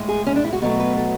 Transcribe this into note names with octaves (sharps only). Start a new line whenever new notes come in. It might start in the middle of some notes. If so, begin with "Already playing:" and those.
Already playing: A2 G#3
G#4
C#4
D4
E4
F#4
B2 F#3 A3 A4
B4
A4